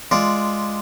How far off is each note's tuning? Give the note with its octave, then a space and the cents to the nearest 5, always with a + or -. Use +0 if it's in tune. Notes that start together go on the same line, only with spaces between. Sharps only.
G#3 +0 F4 -5 D5 +0